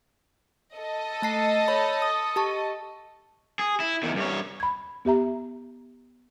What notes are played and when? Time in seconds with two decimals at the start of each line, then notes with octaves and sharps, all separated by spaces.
0.78 A4 D#5
1.22 A3 A5 C7
1.68 C#5 B5
2.02 D#6
2.36 G4 A5 C#6
3.59 G#4
3.80 E4
4.03 E2 D#3
4.17 G2 C#5
4.60 B5 G#6
5.05 B3 G4 E5 A#5